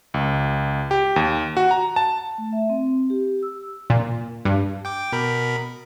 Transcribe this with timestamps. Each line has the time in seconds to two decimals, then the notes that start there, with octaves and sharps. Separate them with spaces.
0.14 C#2
0.91 G4
1.16 D#2
1.57 F#4
1.71 A#5
1.96 A5
2.38 A3
2.53 E5
2.69 C4
3.10 G4
3.43 E6
3.90 A#2
4.45 G2
4.85 G5 D6
5.12 B2 A#4 B5